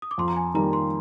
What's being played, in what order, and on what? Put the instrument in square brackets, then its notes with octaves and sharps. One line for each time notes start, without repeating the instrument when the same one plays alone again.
[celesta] D#6
D6
[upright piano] F2 [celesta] C6
[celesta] A#5
G#5
[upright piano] D#3 G3 A#3 [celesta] A#5
[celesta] C6